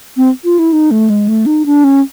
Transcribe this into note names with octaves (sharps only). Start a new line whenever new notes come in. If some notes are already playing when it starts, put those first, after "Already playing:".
C4
F4
E4
D#4
A3
G#3
A3
D#4
D4
C#4